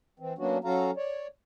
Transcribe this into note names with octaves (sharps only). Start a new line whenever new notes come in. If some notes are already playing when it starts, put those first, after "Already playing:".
E3 C4
F#3 A#3 B3 C#4 D4 F#4
F#3 C#4 F#4 A4 F5 A#5
C#5 D5